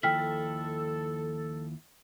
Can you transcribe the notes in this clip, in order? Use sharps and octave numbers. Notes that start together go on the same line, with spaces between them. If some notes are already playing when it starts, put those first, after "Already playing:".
D#2 F3 E4 A4 G5 F6 B6